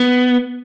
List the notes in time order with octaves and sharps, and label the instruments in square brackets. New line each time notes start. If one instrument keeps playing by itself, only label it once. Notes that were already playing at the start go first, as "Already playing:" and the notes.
Already playing: [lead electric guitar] B3